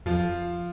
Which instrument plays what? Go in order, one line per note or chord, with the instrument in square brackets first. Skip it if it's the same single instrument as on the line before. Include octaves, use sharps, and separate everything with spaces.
[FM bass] F2 [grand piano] F3 F4